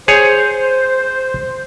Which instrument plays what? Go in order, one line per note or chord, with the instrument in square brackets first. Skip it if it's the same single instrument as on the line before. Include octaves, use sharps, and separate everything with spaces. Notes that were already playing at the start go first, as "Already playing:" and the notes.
[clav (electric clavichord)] G#4 C#5 [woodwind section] C5